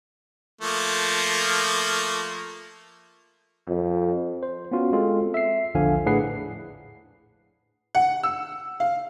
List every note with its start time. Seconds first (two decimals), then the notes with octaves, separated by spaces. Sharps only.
0.61 F3 A3 A#3
3.68 F2
4.43 C5
4.71 B3 C#4 F4 F#4
4.92 G#3 C4 F4 A4
5.34 E5 C7
5.74 A#1 E2 D3 F3 F5 G#5
6.06 A2 D4 G#4 B4 F#5 C7
7.95 F#5
8.23 E6
8.80 F5